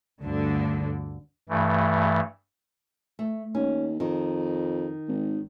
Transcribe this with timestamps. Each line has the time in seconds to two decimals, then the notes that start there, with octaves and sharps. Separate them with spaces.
0.23 D2 G2 D3
1.49 G2 E3 A3
3.19 A3
3.55 D#2 C#4
4.00 F2 D#3
5.08 G#1